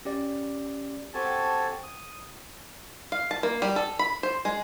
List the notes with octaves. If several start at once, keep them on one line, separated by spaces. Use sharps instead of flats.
C#4 G4 D5
C4 F#4 G4 A4 G#5 A5
D#6
F5
A5
A#3
G3
A4
B5
C5
G#3